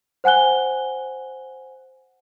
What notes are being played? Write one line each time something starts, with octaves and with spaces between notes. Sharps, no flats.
C5 F#5 G#5 F#6 G7